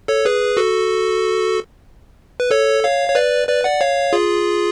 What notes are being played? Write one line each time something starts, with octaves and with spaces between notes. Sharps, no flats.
A4 C#5
G#4 B4
F#4 A4
B4
A4 C#5
C#5 F5
C#5
B4 D5
B4 D5
D5 F#5
C#5 F5
F4 G#4